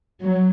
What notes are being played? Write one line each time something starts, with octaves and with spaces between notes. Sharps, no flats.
F#3